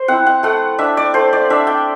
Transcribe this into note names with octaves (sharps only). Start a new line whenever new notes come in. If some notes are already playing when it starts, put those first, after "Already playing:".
Already playing: C5
C4 E4 F#5
F#5
A3 F#5
D4 E5
D5
A3 C5
D5
D4 E5
G5